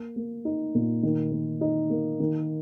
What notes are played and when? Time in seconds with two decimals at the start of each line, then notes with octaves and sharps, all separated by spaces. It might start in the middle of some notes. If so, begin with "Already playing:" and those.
Already playing: A#3
0.16 A#3
0.45 D#4
0.75 A#2
1.03 D#3
1.32 D#3
1.61 D#4
1.90 A#3
2.20 D#3